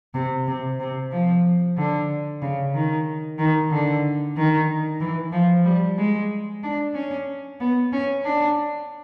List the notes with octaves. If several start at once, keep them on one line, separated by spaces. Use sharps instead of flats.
C3
C3
C3
F3
D3
C#3
D#3
D#3
D3
D#3
E3
F3
G3
G#3
D4
C#4
B3
C#4
D4